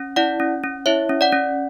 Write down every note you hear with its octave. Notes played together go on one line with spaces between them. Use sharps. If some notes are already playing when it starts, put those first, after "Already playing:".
Already playing: C#4
E4 D5 F#5
C#4
C#4
E4 C#5 E5
C#4
D5 F#5
C#4